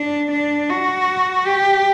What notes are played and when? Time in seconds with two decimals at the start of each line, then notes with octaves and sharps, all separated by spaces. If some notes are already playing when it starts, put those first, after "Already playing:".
Already playing: D4
0.31 D4
0.69 F#4
1.47 G4